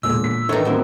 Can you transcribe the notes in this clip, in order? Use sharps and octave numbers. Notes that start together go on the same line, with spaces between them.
E1 A#2 D3 E6
B6
A2 D#3 D4 D#4 B4 C#5
D2 F#3 B3 C4 F#4 A#4